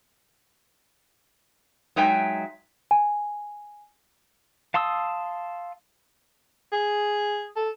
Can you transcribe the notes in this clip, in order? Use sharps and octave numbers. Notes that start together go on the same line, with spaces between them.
F#3 G#3 D#4 E5 G5 G#5
G#5
F5 A5 C6 D#6 E6
G#4
A4